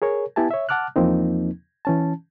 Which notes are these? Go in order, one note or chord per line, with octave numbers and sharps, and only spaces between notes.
G#4 A#4 C#5
B3 E4 G4 G#5 A5
C#5 E5
F#5 A5 D6 F6 F#6
E2 F3 A#3 C4 D#4
E3 C#4 A5